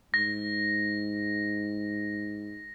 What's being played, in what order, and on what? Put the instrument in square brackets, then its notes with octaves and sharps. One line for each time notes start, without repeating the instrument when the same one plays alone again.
[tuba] G#2 [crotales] A#6